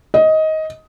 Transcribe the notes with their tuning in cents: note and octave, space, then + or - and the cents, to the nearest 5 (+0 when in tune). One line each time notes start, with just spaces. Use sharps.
D#5 +15